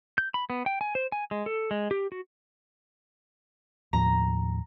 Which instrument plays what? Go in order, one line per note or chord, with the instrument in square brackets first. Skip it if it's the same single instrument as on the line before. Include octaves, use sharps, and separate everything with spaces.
[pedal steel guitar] G6
B5
B3
G5
G#5
C5
G#5
G#3
A4
G#3
G4
F#4
[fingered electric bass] D#2 A2 F3 [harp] A#5